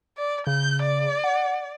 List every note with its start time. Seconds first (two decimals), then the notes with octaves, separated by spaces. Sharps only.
0.18 D5
0.47 C#3 G6
0.82 D5
1.24 F#5